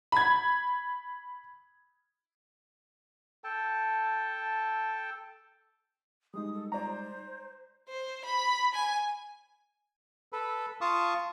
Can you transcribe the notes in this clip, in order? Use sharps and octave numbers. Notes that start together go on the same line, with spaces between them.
B5 G#6
A4 G5 A5
G3 G#3 D#4 D#6
A4
C5 D5 A#5
C5
B5
G#5
A4 B4
F4 F5 A5 C#6 D#6